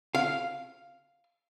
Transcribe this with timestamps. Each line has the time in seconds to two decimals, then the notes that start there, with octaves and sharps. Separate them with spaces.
0.15 F5